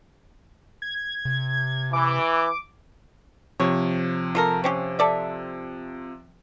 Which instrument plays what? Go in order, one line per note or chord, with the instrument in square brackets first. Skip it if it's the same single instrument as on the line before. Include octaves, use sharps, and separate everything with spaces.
[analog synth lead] G#6
[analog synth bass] C3
[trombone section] E3 [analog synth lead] D6
[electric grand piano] C3 F3 [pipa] C#5
[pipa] F4 A4 A#4
C4 C#4 G4
A4 D5 E5